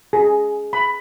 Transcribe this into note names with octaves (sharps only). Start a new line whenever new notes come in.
G#4
B5